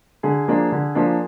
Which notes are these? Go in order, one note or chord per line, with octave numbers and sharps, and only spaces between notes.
D3 G#4
F3 A#3 D4
D3
F3 A#3 D4